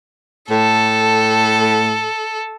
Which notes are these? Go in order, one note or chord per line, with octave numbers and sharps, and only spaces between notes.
A2 A4